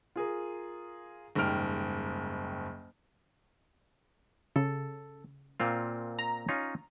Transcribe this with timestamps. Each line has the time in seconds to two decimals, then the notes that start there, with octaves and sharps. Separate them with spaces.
0.16 F4 G#4 A#4
1.35 F#1 D#2 G#2 G3 F6 D7
4.56 C#3 A4
5.60 A#2 C4 F4
6.19 A#5
6.48 C#4 D#4 F4